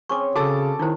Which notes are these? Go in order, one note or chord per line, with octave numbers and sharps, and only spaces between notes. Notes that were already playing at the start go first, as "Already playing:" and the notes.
C4 C#4 G#4 C#6 D6
C#3 F#4 A4 A5 D6 E6
D#3 D#4 E4 C5